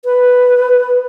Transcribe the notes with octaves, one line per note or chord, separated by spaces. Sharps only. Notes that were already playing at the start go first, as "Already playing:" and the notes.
B4